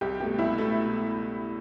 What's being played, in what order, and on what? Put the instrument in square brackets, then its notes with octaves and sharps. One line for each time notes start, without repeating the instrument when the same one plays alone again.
[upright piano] C2 [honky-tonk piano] G4
[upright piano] B2 A3 [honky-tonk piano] G4
[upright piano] C2 [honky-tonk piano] E4
[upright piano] B2 A3